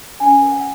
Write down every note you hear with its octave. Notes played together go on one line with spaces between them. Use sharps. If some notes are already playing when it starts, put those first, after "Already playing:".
C#4 G#5
A#4
F#5